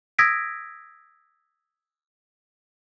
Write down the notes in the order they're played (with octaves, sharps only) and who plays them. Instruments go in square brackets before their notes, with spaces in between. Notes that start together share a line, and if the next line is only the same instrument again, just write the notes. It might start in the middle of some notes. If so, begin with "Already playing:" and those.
[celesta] D#6 E6 G#6 A#6 B6 D7